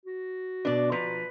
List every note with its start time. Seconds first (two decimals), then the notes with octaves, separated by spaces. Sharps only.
0.06 F#4
0.65 B2 B3 D4 B4 D5
0.92 F3 B4 A#5